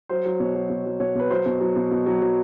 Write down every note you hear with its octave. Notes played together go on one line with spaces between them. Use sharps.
F#3 C5
F#3
B2 C#5
F#3
B2
F#3
B2 C#5
B2 B4
F#3 C5
B2
F#3
B2
B2
F#3
F#3